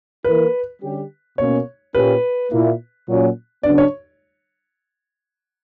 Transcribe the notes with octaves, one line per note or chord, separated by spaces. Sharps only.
E3 A#3 E4 A#4 B4
D3 G3 C#4 G4
B2 A#3 C#4 C#5
A#2 A#3 C#4 G4 B4
A#2 A#3 E4
A#2 F#3 C#4
C#3 F#3 B3 D4 D5
C#5